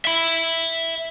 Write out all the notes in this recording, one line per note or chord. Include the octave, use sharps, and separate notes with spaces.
E5 B5